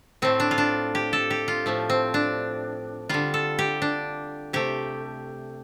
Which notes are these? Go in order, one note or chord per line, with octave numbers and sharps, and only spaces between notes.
A2 A3 C4
D4
F4
D4
G4
A4
G4
F4
A2 F3 A3
C4
D4
D3 G3 F4
A4
G4
D4
C3 A3 G4